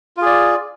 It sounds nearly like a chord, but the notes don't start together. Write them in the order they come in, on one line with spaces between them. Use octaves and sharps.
F4 G#4 D5